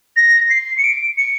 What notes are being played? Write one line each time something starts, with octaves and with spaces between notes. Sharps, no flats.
A#6
C7
C#7
D7
C#7